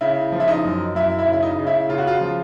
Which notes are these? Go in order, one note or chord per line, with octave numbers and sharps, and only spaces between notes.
C#3 E4
F3
E4
D#4
F#2
F#2 E4
E4
C#3
E4
D#4
C#3
E4
C#3 F4
F#4
F4
F3